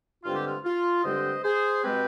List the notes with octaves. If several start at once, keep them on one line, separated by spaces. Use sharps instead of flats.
G2 D3 G#3 C4 F4
G4
F4
F4
G2 D3 G#3 C4 C5 D#5
G#4 C5
B2 G#3 C4 G4 B4